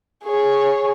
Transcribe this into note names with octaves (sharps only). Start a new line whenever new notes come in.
G#4 C#5